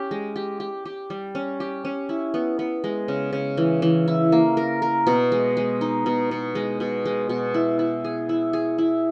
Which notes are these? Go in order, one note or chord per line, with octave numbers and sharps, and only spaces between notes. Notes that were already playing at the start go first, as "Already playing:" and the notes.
Already playing: C#4 G4
G#3
G4
G4
G4
G3
C#4
G4
C#4
E4
B3
B3
G#3
C#3
C#3
E3
E3
E4
A#3
A#4
A#4
B2
G#3
G#3
D#4
B2
B2
G#3
B2
G#3
B2
E4
E4
G#4
E4
G#4
E4